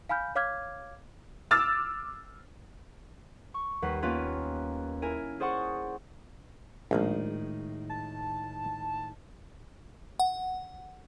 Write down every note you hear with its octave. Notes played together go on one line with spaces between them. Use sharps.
F5 G#5 B5 F6 G6
C#5 F5 D6 F6 G#6
D6 E6 F6 A6
C#6
D#2 G3 B4 F#5 C7
A#3 B3 C#4 F4 B4
E4 A#4 G#5
G#4 C5 D5 F#5 C#6
A#1 A2 D#3 G#3
A5
F#5